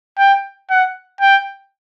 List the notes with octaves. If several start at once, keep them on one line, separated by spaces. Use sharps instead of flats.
G5
F#5
G5